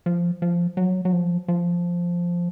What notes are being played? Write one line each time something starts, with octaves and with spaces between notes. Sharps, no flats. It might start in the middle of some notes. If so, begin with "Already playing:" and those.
F3
F3
F#3
F#3
F3
F3